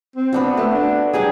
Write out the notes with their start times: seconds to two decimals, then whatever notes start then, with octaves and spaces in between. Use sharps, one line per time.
0.16 C4
0.33 B3 D4 F#4
0.57 A3 F#4
0.73 D4
1.13 F#3 G3 D4 G#4